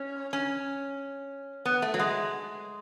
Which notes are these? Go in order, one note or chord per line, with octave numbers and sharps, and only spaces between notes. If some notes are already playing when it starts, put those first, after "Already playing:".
Already playing: C#4
C#4
B3
A3
F#3
G#3